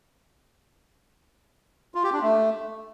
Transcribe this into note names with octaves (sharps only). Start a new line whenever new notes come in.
F4
G4
D4
A3